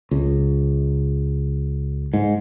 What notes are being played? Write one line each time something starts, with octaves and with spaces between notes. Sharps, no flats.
C#2
G#2